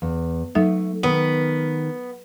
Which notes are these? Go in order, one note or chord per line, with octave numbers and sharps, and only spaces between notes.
E2
F#3 A3 D#4 E5
D#3 B3 D#6